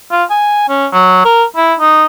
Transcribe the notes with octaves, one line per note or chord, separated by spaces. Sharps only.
F4
G#5
C#4
F#3
A#4
E4
D#4